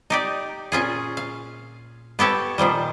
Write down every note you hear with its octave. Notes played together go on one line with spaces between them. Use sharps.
D#4 G4 D5
A#2 C#4 F4 G#4
F5
B3 G4 A4 C#5
A#2 D#3 F3 G3